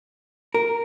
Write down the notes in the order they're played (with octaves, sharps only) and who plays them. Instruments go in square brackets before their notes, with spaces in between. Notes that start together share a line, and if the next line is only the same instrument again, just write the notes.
[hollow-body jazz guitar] A#4